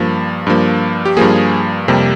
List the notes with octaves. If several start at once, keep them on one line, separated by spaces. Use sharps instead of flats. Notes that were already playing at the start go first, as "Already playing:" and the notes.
Already playing: G2 F3 A#3
G2 F3 A#3
G4
G2 F3 A#3 G#4
F2 C3 G3 A#3